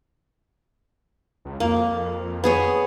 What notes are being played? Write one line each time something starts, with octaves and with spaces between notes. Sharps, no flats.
C#2
F2 A#3
B3 G#4 C#5